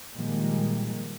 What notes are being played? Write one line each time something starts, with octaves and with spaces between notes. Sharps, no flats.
A#2 D#3 F3 G3 G#3 A#3